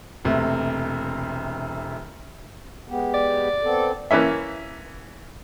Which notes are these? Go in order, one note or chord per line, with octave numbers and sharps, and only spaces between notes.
E1 C3 A3
G#3 B3 G4
D5
B3 C4 A4
E3 A#3 C#4 E5